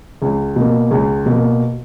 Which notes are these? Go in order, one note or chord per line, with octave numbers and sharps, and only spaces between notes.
C#2
B2 A#3
C#2
B2 A#3